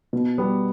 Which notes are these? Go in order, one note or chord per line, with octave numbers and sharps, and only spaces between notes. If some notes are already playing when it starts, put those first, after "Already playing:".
B2
G3 B3